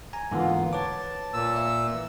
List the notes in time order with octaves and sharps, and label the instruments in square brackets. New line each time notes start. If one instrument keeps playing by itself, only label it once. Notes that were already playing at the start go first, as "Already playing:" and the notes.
[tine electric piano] G#5 A#5
[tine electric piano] G#2 D3 E3 [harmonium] A#3 B3 F4
[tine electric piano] B4 C#5 D6 [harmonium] A5
[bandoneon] A#2 E6
[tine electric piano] E5
[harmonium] E3